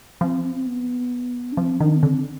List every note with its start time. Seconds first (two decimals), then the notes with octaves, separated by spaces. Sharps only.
0.21 F3 C4
0.43 C4
0.56 C4
0.67 B3
1.52 D4
1.57 F3 C4
1.80 D#3 D4
1.96 B3
2.02 D3 C4